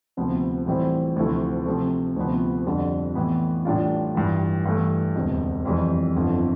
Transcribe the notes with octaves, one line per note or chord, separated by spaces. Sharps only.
D2 C3 F3 B3
A2 E3 G3 C4 E4
D2 C3 F3 A3 E4
C3 F3 A3
D2 C3 F3 B3
F2 D3 G3 D4
A2 E3 B3
A1 A2 G3 D4 F4
A1 G2 E3
G2 E3 A3
E1 D2 C3
F2 E3 G3
G1 F2 D3